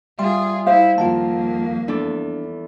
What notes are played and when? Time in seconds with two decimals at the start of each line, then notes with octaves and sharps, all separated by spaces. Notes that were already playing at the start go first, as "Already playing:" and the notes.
0.19 G3 F4 G#4 E5 C6
0.67 E4 C5 F5
0.98 F2 D#3 A#3 F4 F#5 A5
1.88 E2 D4 A4 D6